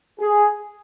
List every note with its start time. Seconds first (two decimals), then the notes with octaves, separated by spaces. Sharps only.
0.20 G#4